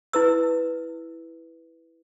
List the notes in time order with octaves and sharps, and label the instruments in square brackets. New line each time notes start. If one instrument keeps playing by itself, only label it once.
[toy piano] E4 B4 E6